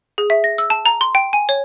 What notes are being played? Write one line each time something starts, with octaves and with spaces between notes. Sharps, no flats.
G#4
E5
A#6
E6
A5
A#5
C6
G5
G#5
C#5